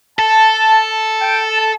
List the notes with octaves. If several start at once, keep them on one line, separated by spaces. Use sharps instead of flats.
A4 A5
G5
A5
A5